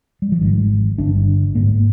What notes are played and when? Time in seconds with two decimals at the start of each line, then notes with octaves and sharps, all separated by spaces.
0.22 G3
0.32 F3
0.41 G#1 G#2 D#3
0.98 G1 G2 D3 D4
1.55 G#1 G#2 A#3